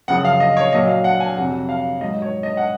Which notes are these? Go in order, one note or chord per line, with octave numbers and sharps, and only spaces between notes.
F#2 C#3 F3 F#5
F5
D#5
C#5
A#2 F#3 D#5
F5
F#5
G#5
F2 C3 F#3 F#5
F5
G#2 F#3 D#5
C#5
D#5
F#5